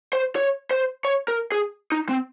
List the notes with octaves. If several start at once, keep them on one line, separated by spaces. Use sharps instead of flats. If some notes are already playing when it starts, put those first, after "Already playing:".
C5
C#5
C5
C#5
A#4
G#4
D#4
C4